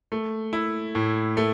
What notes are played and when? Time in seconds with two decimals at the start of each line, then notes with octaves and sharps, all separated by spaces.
0.12 A3
0.53 E4
0.95 A2
1.37 A3